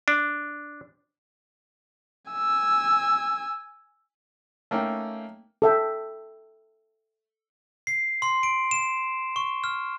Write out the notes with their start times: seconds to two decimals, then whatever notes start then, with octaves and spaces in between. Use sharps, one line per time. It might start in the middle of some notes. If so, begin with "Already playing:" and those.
0.08 D4
2.32 G#5 E6
4.71 A3 A#3 C#4 D#4 G5
5.62 A4 E5 G5
7.87 C7
8.22 C6
8.43 D7
8.71 E7
9.36 C#6
9.64 F6